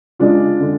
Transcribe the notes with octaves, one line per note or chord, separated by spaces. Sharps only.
G#3 D4 F4
D3